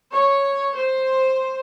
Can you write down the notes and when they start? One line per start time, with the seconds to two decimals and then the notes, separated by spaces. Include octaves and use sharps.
0.13 C#5
0.77 C5